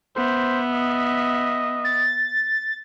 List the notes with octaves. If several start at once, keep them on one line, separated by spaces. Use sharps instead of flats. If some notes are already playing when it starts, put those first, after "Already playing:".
B3 C5 E5
D#5
A6